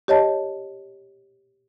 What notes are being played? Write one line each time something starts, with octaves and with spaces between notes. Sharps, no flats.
G4 C#5 D#5 A5